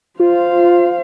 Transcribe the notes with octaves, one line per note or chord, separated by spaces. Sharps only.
F4 C5 F5